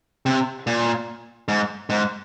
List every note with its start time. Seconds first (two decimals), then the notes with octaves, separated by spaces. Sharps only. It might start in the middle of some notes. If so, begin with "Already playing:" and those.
0.26 C3
0.67 A#2
1.48 G#2
1.90 G#2